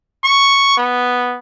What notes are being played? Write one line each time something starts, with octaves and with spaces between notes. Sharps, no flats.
C#6
B3